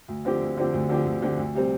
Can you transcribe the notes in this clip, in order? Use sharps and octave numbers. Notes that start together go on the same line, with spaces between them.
D2
D3 F3 C4 G4
D2
D3 F3 C4 G4
D2
D3 F3 C4 G4
D2
D3 F3 C4 G4
D2
C3 G3 C4